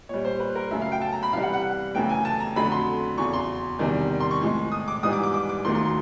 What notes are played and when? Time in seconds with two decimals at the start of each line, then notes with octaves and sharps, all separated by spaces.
0.09 A#2 G3 C#5
0.25 C5
0.40 B4
0.55 A#4
0.71 F#2 C#3 F#3 A3 E5
0.81 F5
0.92 G5
1.01 A5
1.13 A#5
1.23 B5
1.33 C2 C3 E3 G3 F5
1.43 F#5
1.53 F#5
1.95 F#2 C#3 E3 A3 G5
2.09 G#5
2.25 A5
2.40 A#5
2.56 F2 D3 F#3 A3 B5
2.72 C6
3.18 E2 C#3 F#3 C#6
3.33 C6
3.79 E2 C3 D#3 G3
4.20 C6
4.31 C#6
4.41 A2 F3 G#3
4.72 D#6
4.88 D6
5.03 G#2 E3 G3 D#6
5.13 D6
5.23 D6
5.34 D6
5.49 D6
5.65 D#2 D#3 F#3 A3 C6
5.75 C6
5.85 C6